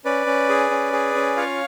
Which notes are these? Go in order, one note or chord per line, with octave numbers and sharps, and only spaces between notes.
C#4 B4 D5
C#4
G#4
C#4
G#4
C#4
F4 C#5 F5